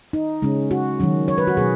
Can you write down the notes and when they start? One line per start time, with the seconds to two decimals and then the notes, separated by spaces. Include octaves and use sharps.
0.13 D#4
0.42 C#3 G#3 C#4
0.71 F#4
1.00 D#3 F#3 C#4
1.28 C#5
1.38 B4
1.47 F#4
1.57 B2 F#3 B3 G#4